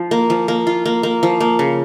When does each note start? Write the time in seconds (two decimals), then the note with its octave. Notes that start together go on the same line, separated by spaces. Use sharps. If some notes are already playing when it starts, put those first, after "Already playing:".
Already playing: F3 F4
0.11 A#3
0.30 F3
0.48 A#3
0.67 F4
0.86 A#3
1.03 A#3
1.23 F3
1.40 A#3
1.59 C#3